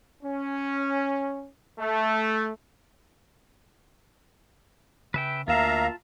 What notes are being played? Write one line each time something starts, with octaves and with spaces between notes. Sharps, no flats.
C#4
A3
C#3 B4 E5 G5
D2 A#3 F4 E5 F5 A5 A#5